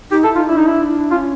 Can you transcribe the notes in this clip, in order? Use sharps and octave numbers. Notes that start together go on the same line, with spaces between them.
D#4 G4
E4 A4
D#4 F4
D4 E4
D#4
E4
C#4 F4